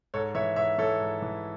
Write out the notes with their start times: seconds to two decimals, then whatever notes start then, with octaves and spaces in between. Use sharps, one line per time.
0.14 G#2 A4 C#5
0.35 E3 C#5 E5
0.56 G#2 C#5 E5
0.78 E3 A4 C#5
1.00 G#2
1.22 E3